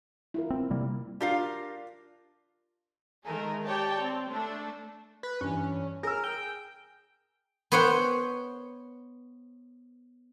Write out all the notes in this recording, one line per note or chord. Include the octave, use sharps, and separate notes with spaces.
E4 F4 A#4
C4
C3 G3 A#3
D4 F4 G4 A#4 F5
D#3 G#3 A3 G#4 A#4
G4 C#5 D5 G5 A5
C4
A3 D4 A4
B4
G2 E3 C#4
G#4 A#4 E6
G5
B3 C5 C#5 F#5 G5